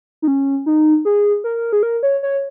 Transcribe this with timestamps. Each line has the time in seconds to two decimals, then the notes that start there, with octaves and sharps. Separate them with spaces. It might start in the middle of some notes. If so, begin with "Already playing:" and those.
0.22 D#4
0.28 C#4
0.66 D#4
1.05 G#4
1.44 A#4
1.73 G#4
1.83 A#4
2.03 C#5
2.23 C#5